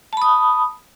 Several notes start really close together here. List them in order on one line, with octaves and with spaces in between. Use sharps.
A5 B5 D#6